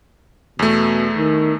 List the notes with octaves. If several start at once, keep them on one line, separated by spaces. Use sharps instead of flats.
E2 B2 A3
D#3